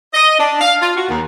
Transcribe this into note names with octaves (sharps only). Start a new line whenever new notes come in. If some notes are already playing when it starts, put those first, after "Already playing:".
D#5
D4
F5
F4
F#4
D#2